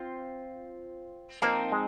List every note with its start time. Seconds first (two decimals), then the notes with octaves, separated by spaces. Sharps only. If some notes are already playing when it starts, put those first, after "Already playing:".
Already playing: C4 F4 C5
1.42 F3 A#3 C4 D#4
1.72 G#3